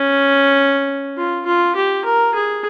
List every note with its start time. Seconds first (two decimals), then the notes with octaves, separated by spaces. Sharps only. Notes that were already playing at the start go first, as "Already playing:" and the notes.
Already playing: C#4
1.17 F4
1.46 F4
1.75 G4
2.05 A#4
2.34 G#4